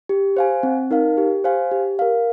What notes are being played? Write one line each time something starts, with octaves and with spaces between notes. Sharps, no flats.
G4
C5 F5 G#5
C4
D#4 A#4 F5
G4
C5 F5 G#5
G4
A#4 F5